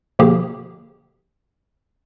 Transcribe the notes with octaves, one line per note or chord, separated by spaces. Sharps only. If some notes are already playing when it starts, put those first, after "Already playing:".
B2 D3 F3 A#3 G4 G#4